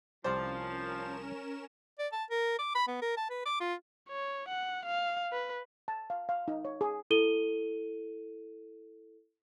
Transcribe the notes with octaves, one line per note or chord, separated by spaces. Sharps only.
C2 F3 C#4 G4 A#4 C5 D5 E7
D5
A5
A#4
D6
B5
B3
A#4
A5
B4
D6
F4
C#5
F#5
F5
B4
A5
F5
F5
D#4
C#5
G#4
E4 A4 D#7 G7